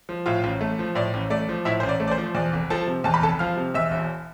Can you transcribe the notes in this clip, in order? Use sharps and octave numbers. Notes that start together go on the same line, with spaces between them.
F3
A2 F4 F5
A1
A3
F3
A2 D5
A1
A3 D5
F3
A2 E4 E5
A1 C5
D5
A3
D5
C5
F3
E2 D5
F1
F3 A4 A5
C3
E2 A5
B5
F1 A4 A5
F3 F5 F6
C3
E2 E5 E6
E1